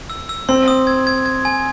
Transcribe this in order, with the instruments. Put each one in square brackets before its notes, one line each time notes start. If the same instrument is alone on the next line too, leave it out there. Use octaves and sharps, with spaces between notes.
[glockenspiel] E6
E6
[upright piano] C4 [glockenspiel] C6
[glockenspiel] D#6
G#6
G#6
G#6
G#5